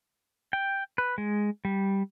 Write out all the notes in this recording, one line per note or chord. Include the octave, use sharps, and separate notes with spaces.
G5
B4
G#3
G3